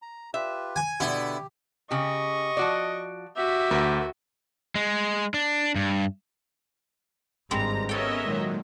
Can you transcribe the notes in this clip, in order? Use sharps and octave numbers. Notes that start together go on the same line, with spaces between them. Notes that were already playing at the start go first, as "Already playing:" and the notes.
A#5
F4 G4 B4 E5
G#5
B2 D3 B3 E4 G4
C#3 G4 D#5 C#6
F3 F#4 D5
F#4 G4 E5
D2 A#4
G#3
D4
G2
G#1 G2 G3 G#3 C4 A#5
B3 C#4 A4 A#4 C#5 D#5 E5 G5
A#2 D#3 F#3 G#3